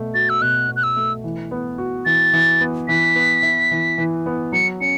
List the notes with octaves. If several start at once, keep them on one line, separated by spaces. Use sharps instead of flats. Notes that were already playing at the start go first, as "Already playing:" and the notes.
Already playing: B2 A3
F#4 A6
E6
B2 F#6
B2
F#6
E6
A3
E3
B3
F#4
E3 A6
E3
B3
E3 B6
B3
E4
E3
E3
B3
F#3 C#7
C#4 C#7